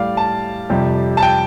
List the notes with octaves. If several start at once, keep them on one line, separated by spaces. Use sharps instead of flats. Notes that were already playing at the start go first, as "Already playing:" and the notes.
Already playing: A2 G3 D5 F5
A5
F2 C3 G3
A5
G5